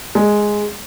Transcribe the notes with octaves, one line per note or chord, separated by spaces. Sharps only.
G#3